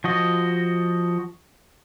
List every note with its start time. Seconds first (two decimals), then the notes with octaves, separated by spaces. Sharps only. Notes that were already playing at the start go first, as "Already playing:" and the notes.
0.04 F3 F#4 D#5